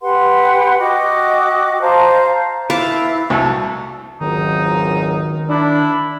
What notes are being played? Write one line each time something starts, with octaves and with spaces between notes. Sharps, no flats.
G4 B4 F#5 C6
F#4 D#5 G5 D6
C5 F5 A5 A#5
E4 B4 F5 A5 D6
C2 A3 F#4 A4
G#1 C#2 D#3 F#3 D#4
D4 E4